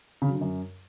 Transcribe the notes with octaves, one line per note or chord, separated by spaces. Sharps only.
C#3
F#3
D3
F#2